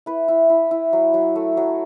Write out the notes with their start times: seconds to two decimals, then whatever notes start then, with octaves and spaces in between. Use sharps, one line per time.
0.06 E4 B4
0.28 E4
0.49 E4
0.71 E4
0.93 F#3
1.14 F#3
1.36 A3
1.57 F#3